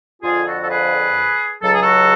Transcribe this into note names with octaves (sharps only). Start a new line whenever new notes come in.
F2 D3 F3 F4 G#4
F#4 A4
A4
G#4 B4
C#2 C#3 F#3 A4
G#4
F#4 A4